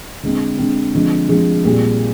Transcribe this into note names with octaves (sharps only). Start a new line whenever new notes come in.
D3 G#3 C4
D3 G#3 C4
D3 F3 G#3 C4
D3 F3 G#3 C4 G#4
A#2 G3 C4 G#4